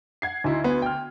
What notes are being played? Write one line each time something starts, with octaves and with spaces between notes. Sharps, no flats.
F#5 G#6 C7
D2 D#4 E4
B3
G5 F6